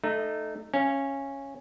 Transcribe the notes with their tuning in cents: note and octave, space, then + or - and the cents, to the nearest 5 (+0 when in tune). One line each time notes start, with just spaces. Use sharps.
A3 +0 D#4 -20
C#4 -10 F5 -30